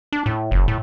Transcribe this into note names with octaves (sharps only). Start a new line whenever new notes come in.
D4
A2
F#1
A2